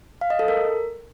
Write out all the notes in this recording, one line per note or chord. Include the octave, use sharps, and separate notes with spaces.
F5
D#5
A4
A#4